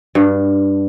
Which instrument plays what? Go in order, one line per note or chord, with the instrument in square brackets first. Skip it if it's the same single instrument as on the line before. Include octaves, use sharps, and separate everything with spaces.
[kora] G2